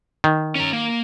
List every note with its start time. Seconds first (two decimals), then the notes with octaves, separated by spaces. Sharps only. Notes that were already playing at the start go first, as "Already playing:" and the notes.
0.24 D#3
0.55 C#4 A#5
0.73 A#3